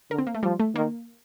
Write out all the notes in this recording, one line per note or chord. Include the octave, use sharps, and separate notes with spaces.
D3 A#4
C4
A#3
A3
F3 G3
A3
D#3 A#3